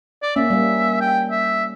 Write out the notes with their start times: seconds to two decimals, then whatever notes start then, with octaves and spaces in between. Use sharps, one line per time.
0.22 D5
0.36 A#3 C#4 E5
0.50 G3 A#3
1.01 G5
1.31 E5